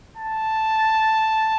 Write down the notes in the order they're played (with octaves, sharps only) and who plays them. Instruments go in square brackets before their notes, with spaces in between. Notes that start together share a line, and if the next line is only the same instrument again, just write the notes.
[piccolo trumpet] A5